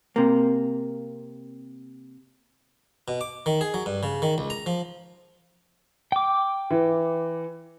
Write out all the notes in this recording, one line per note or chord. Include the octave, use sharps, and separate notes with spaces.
C3 A#3
B2
D6
D#3
G#4
F#3
G2
C#3
D#3
C#2
A#5
F3
G5 D6
E3